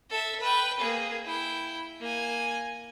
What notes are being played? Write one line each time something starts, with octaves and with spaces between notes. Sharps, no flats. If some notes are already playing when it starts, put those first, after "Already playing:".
A4 E5
B4 G5
A#3 G#4
E4 G5
A#3 G#5